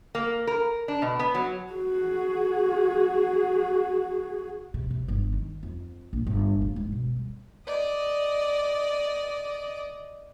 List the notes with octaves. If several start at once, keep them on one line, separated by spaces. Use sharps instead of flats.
A#3
A#4
D4
B2
B3
F#3
F#4 G#4
C3
C3
G1
D#3
F2
A#1
G1
D1
G#2
B2
G3
D5 D#5